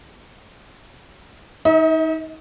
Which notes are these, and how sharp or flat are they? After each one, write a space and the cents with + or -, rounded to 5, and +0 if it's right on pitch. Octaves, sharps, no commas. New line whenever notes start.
D#4 +25 E5 -45